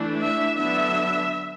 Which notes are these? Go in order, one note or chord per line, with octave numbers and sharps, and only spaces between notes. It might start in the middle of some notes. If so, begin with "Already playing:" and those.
Already playing: E3 A3 D4
E5
D3 F#3 B3 D4 E5